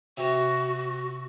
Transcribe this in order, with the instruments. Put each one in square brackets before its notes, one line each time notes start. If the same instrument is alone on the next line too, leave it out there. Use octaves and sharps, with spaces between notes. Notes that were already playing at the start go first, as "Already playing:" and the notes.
[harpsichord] C3 [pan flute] F#4